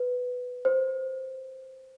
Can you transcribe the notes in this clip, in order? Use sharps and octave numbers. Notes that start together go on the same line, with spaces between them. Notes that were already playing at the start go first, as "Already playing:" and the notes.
Already playing: B4
C5